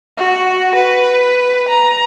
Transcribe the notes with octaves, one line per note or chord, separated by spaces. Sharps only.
F#4
B4
A#5